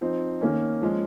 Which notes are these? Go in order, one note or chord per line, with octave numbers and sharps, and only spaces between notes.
F3 C4 D#4
D#3 A#3 C#4
F3 G#3 C#4